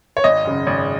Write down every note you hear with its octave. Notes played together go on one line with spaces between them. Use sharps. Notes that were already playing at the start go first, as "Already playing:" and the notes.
C#5
G#1 D#5
F#2 C#3
G#1